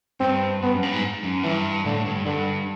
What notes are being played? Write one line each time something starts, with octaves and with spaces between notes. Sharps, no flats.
G2 C4
G2 B3
F#2
G2
G#2
F#2
G2 E3
A2 D3
G2
G2 D3